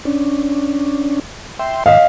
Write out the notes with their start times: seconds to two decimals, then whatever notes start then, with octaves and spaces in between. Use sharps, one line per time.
0.05 C#4 D4
1.59 E5 G5 C6
1.86 G#2 D#3 D#5 F5 E6